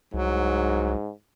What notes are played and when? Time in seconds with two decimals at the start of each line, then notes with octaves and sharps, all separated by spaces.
0.14 C2 G#2 F#3